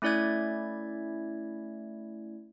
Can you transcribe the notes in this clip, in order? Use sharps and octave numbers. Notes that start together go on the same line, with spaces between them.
A3 C#4 E4 D5 E5 G#6